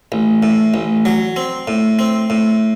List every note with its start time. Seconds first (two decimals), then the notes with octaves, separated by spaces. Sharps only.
0.12 A1
0.43 A2
0.74 A1
1.05 F#3
1.36 C4
1.68 A2
1.99 C4
2.30 A2